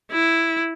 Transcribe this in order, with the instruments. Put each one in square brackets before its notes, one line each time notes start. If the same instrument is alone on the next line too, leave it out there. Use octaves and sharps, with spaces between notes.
[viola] E4